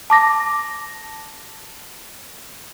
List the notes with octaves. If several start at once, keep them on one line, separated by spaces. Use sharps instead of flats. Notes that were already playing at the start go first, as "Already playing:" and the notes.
A5 D6 A#6